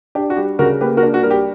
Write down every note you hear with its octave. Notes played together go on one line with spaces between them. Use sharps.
D4 G4
F#4
G3 G4
C#3 F#4 A#4
A#3 G4 B4
F#4 A#4
D4
F#4
G3 A#4
G4